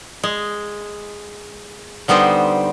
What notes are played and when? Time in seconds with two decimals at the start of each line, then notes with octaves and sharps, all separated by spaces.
0.23 G#3
2.08 D3 G3 B3 D#4 C5